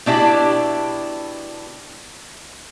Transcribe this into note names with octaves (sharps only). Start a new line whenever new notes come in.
B2 D4 E4 G4